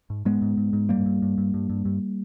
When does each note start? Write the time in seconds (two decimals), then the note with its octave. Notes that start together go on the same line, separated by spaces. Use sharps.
0.10 G#2
0.25 G#2 G#3 B3
0.42 G#2
0.57 G#2
0.73 G#2
0.89 G2 G3 A#3
1.06 G2
1.22 G2
1.38 G2
1.54 G2
1.70 G2
1.85 G2